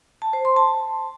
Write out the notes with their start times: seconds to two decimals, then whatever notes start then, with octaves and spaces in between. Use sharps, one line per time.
0.22 A5
0.33 C5
0.45 C6
0.56 A5